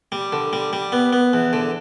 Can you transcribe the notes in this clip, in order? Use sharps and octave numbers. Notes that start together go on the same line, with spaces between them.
G3
D3
G3
G3
B3
B3
E2
D3